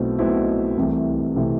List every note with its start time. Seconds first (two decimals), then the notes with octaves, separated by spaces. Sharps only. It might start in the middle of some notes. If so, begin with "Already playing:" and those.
Already playing: B1 B2 A3 C4 E4
0.19 B1 B2 A3 C4 E4
0.77 C2 C3 E3 A3
1.36 C3 E3 A3